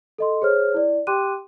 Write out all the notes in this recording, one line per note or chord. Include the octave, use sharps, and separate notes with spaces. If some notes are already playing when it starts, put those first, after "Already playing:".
A4 D#5 C6
G#4 C5 C#5 F6
E4 D5
G4 G5 C6 D6 F#6 D#7